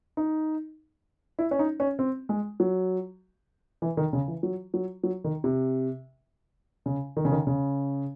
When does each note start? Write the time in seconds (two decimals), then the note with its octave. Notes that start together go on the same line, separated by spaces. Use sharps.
0.17 D#4
1.39 E4
1.51 C#4
1.59 D#4
1.80 C#4
1.99 C4
2.29 G#3
2.60 F#3
3.82 E3
3.97 D#3
4.13 C#3
4.28 E3
4.43 F#3
4.74 F#3
5.03 F#3
5.24 D#3
5.44 C3
6.86 C#3
7.17 D#3
7.25 C#3
7.32 D#3
7.47 C#3